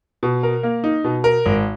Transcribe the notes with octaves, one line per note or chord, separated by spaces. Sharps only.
B2
A#4
A#3
D#4
B2
A#4
G#1